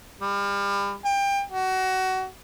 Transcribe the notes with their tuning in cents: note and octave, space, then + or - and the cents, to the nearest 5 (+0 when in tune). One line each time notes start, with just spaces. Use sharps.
G3 +35
G5 +25
F#4 +25